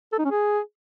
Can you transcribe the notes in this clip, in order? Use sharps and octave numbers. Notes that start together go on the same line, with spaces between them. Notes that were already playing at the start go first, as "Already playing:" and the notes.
A4
D#4
C#4
G#4